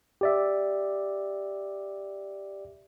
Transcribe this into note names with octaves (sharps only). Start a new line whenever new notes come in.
G4 D5 E5